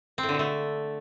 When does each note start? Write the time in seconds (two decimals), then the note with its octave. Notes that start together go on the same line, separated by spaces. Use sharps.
0.18 C4
0.23 A2
0.29 D3
0.34 B2
0.39 A3